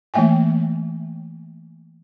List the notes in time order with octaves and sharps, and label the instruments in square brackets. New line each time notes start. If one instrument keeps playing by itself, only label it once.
[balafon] E3 A3 A#3 E5 G5 G#5